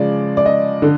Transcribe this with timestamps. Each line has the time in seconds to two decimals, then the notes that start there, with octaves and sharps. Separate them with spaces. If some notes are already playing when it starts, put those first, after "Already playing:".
Already playing: C#3 F3 G#3 D5
0.37 D5
0.46 D#5
0.82 D3